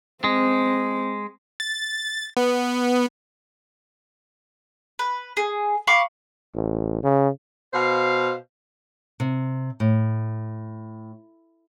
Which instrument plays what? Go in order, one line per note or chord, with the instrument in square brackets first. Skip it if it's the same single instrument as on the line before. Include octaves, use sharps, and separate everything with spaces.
[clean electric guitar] G#3 [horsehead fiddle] C4
[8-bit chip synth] A6
B3
[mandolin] B4
G#4
F5 B5 C#6 D6
[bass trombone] A1
C#3
[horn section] B2 C5 F5
[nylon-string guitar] C3
A2